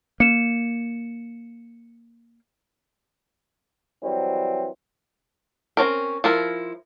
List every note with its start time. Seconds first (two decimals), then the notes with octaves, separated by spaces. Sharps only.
0.20 A#3 C#7 E7
4.03 E3 F#3 G3 C4
5.77 C4 C#4 A#4
6.24 F3 E4 A#4